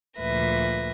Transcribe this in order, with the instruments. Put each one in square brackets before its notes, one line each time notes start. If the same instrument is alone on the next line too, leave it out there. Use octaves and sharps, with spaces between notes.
[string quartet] D2 A#2 F3 B4 E5 A#6